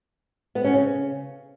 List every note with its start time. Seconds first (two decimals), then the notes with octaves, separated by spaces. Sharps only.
0.55 B3
0.64 C#4
0.74 C#3